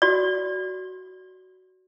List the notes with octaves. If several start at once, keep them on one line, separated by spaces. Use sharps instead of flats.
F#4 D5